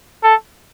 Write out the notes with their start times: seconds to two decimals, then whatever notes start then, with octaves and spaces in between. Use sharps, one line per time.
0.24 A4